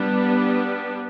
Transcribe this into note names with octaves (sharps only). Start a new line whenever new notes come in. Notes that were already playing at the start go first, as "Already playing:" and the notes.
Already playing: G3 B3 D4